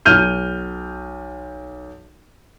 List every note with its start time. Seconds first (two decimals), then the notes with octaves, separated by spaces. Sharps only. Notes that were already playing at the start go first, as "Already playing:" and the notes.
0.05 B1 F6 G6 D#7